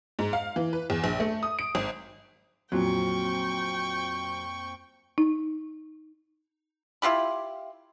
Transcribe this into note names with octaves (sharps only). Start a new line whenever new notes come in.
G#2
F5
E3
B4
E2
A#1
A3
D#6
D7
G#1
F2 A#2 F#3 G5 C#6
D#4
E4 F4 G4 B5